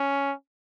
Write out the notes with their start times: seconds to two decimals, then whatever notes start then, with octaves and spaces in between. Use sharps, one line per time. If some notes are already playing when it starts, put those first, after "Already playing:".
Already playing: C#4